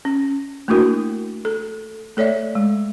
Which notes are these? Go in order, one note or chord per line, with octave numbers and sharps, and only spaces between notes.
C#4
A3 A#3 D4 E4 F#4 A#4
A4
A3 A4 C#5 D5 E5
G#3